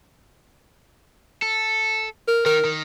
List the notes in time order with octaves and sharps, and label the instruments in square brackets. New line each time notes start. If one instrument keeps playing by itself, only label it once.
[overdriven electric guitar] A4
[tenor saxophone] A#4
[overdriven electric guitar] D#3 [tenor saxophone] A#4
[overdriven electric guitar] D#3